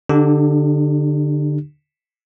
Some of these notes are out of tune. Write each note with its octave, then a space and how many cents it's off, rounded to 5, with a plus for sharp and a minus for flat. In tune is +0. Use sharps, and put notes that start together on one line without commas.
D3 +0 D4 +45 G4 +0